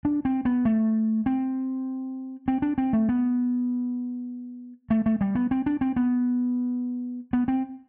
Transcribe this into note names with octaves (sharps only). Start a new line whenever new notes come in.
D4
C4
B3
A3
C4
C4
D4
C4
A3
B3
A3
A3
G3
B3
C4
D4
C4
B3
B3
C4